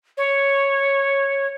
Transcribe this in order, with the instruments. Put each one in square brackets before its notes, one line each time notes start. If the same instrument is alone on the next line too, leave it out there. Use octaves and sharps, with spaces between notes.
[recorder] C#5